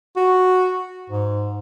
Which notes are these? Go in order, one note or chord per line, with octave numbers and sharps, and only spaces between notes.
F#4
G#2